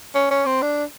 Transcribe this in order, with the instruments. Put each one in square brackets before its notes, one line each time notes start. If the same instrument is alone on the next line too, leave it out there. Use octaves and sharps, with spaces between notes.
[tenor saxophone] C#4
C#4
C4
D4